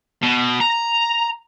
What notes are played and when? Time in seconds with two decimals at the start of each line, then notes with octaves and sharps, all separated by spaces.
0.23 B2
0.60 A#5